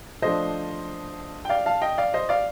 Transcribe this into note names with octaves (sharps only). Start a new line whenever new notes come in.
F3 A3 D4 C5 D#5
G5
D5 F5
F5 A5
D#5 G5
D5 F5
C5 D#5
D5 F5